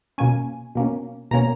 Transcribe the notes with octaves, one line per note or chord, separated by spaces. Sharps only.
B2 A#3 C#4 G#5
B2 A#3 C#4
B2 A#3 C#4 A#5